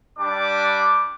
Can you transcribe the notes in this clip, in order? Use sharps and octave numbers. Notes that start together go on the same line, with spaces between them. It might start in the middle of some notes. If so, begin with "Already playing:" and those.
G3 D4 D6